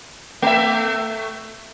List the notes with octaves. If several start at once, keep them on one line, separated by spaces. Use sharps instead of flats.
A3 E5